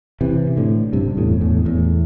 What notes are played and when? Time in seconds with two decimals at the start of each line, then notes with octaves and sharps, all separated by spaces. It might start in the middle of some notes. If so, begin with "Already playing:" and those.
0.21 C3 E3
0.57 A2 D3
0.93 G2 C3
1.17 E2 A2
1.41 E2 A2
1.65 E2 A2